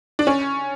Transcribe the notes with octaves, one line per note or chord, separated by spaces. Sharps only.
D4
C#4